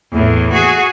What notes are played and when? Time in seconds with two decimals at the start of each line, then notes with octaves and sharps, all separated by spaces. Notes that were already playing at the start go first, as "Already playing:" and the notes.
0.13 E2 A2
0.52 F#4 G#4